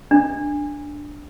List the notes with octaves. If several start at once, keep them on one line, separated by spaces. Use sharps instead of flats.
D4